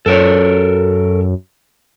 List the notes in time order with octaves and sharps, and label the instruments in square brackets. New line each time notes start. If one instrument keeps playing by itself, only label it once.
[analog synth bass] F#2 [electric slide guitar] A4 A#4 C#5